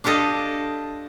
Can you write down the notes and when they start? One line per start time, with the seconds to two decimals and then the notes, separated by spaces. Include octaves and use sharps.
0.04 D4 F4 G4 A4 D#5